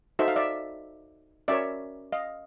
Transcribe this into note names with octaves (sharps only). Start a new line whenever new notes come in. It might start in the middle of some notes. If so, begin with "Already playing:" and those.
D#4 F#4 A4 C5 E5
F5
D5 E5
C#4 F#4 A#4 C#5 D5 E5
D#5 F5